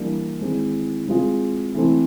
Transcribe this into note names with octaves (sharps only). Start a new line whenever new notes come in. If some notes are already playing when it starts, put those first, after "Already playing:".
Already playing: E3 G3 A#3 D4
D#3 G#3 C4 E4
G#3 C4 F4 G#4
E3 A3 C4